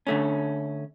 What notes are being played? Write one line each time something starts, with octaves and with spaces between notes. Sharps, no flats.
D3 A3 C#4